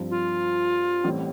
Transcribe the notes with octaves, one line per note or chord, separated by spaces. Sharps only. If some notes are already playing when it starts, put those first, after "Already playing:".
Already playing: G2 F3 C4
F4
A1 A2 G3 C4